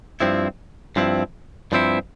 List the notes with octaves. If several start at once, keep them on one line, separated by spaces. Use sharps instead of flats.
G2 F3 C4 E4
G2 F3 C4 E4
G2 F3 C4 E4